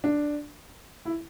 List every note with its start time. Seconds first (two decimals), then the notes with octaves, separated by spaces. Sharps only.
0.04 D4
1.05 E4